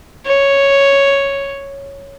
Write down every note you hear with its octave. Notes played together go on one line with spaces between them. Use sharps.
C#5